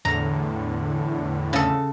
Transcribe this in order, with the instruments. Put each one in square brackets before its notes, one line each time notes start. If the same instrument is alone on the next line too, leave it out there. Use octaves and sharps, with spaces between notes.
[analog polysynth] E2 A2 D3 [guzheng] A#5
[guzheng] C#3 A4